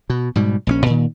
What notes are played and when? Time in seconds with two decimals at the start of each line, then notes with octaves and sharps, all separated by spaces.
0.10 B2
0.36 G#2 B2 G3
0.67 A#1 F3 C#4
0.86 A#2 D#3